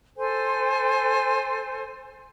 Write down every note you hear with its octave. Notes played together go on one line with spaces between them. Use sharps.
A4 C5 G#5